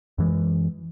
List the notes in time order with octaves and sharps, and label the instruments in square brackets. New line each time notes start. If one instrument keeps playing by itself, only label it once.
[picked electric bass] F#2 E3 G#3